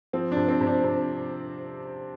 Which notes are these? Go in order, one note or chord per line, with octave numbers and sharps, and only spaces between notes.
F3 C4
C3 D4
C4
C3
D4
C3